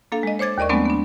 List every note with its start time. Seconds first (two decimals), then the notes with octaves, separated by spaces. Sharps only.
0.12 A#3 D4 A4 F5
0.23 G#3 D#5
0.39 C5 C#5 D6 G#6 A6
0.58 D#2 A#4 D5 D#5 C#6
0.69 F#3 G#3 A3 B3 C4 D4
0.85 B3 D4